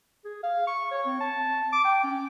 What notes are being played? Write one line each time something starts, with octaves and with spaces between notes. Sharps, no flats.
G#4
F5
C#6
C#5
C4
A5
D6
G5
C#4